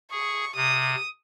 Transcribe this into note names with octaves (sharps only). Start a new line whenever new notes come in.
G#4 C#6
C3 D#6